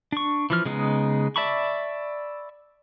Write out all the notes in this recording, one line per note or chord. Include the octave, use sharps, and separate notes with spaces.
D4 C#6
E3 F3 F6
C#3 G#3 B3 D#4
D5 E5 A5 B5 C#6